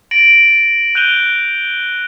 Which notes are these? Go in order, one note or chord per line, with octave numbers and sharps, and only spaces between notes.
A6 A#6 D7 F#7
F#6 G6 D#7 F7 G7